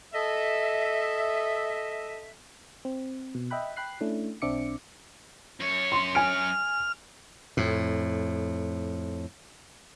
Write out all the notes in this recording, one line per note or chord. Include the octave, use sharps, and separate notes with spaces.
A4 D#5 E5
C4
B2
D#5 E5 G5 B5 F#6
G5 B5 F#6 C7
A3 C#4 D4 E4
B1 C4 D4 E5 D6 C#7
F#2 C#5
C6
G#5 F6 D7
F2 A2